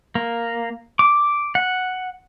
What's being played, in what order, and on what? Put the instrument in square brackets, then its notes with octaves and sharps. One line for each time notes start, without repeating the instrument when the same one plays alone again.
[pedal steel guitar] A#3
D6
F#5